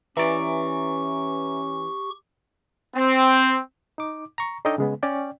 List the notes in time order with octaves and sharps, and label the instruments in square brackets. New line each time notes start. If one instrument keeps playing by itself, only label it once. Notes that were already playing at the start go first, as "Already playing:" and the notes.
[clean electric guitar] E3 D5 [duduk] C#4 [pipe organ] G4 C#6 [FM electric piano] B4 E5 A#5
[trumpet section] C4
[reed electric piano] D#4 D6
A#5 C#6
D4 D#4 A4 C#5 D#5 G5
C#3 G#3 B3
C#4 D5 G5